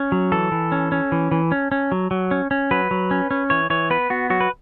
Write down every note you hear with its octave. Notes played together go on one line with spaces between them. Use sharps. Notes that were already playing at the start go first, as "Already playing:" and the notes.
Already playing: C#4
F#3
E3 A4
E3
C#4
C#4
E3
E3
C#4
C#4
F#3
F#3
C#4
C#4
F#3 B4
F#3
C#4
C#4
E3 C#5
E3 C#5
B3 B4
B3 F#4
F#3 F#4
B4